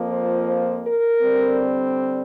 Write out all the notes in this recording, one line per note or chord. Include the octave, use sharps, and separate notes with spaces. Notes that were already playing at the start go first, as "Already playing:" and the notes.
Already playing: F2 F3 A#3
C5
C5
A#4
D3 G3 C4